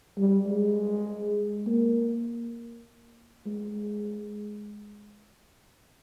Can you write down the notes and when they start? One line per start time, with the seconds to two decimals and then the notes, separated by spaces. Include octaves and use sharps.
0.17 G3
0.47 G#3
1.66 A#3
3.46 G#3